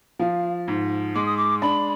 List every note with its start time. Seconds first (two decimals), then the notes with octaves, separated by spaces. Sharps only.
0.19 F3 F5
0.68 G#2
1.15 G#3 D6
1.26 D#6
1.37 D6
1.62 D4 B5